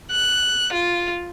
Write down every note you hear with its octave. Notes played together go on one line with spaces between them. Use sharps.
F#6
F4